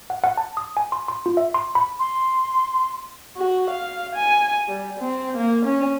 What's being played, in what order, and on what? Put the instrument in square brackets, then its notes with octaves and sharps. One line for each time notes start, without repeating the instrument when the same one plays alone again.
[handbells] F#5
F#5
A5
D#6
G#5
C6
C6
F4
E5
C6
B5
[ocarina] C6
[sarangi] F#4
F5
G#5
G3
C4
A#3
C#4